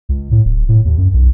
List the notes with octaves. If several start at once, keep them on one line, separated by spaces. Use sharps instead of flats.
C#2
A2
D1
A2
D#2
F#2
B1